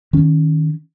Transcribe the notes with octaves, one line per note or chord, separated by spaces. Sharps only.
D#3 C#4